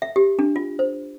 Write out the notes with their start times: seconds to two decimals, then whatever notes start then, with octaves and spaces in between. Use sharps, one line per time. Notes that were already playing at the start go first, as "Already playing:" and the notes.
0.02 E5
0.16 G4
0.39 D4
0.56 F4
0.79 C5